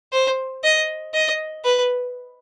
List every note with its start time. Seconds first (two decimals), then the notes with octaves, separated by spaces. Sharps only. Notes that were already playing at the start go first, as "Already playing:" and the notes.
0.13 C5
0.64 D#5
1.14 D#5
1.65 B4